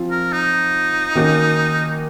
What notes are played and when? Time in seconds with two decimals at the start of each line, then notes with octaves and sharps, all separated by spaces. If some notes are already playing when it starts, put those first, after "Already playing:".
Already playing: F3 C4 F4
0.11 A#4
0.32 D#4
1.16 D#3 A#3 C#4 F#4 A#4